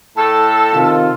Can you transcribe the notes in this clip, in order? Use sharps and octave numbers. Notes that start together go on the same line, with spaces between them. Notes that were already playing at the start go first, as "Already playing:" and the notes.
A2 A4 A5
C3 D#3 F4